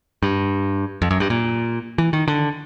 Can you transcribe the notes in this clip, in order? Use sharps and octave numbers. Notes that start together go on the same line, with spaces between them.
G2
F2
F#2
G2
A#2
E3
D#3
D3